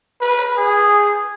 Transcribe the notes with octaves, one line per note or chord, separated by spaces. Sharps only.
B4
G#4